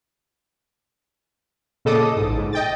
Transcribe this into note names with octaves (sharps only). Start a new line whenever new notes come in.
A#2 C#3 A4 D#5 D6 D#6
A1 G#2
G#2
D#5 G5 A6